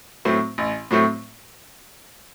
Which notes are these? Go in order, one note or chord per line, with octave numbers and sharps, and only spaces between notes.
A2 F#3 A3 C4
A1
A2 F#3 A3 C4